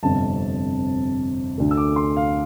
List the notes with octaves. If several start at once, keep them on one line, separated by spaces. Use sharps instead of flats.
G1 F2 C3 A5
D2 D3 A3
E6
D6
C6
F5